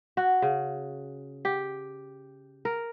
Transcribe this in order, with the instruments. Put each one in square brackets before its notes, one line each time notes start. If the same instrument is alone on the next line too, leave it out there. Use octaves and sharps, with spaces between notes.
[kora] F#4
C#3
G4
A#4